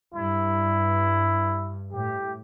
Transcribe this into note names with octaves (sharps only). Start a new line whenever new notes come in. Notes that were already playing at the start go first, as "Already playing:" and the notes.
G2 E4
A2 G4